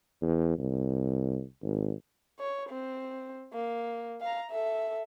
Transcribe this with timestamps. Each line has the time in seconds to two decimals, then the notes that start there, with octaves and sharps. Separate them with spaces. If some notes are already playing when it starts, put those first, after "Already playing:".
0.22 E2
0.59 C2
1.63 G#1
2.39 C#5
2.69 C4
3.53 A#3
4.21 F5 A#5
4.51 A4 E5